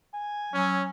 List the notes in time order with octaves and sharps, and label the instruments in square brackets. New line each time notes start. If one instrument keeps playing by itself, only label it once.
[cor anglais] G#5
[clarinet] F#3 [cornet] C#4